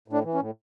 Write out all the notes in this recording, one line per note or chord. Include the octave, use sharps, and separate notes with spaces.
A2 D4
E3
C#4
A2